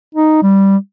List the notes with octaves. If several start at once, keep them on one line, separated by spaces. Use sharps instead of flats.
D#4
G3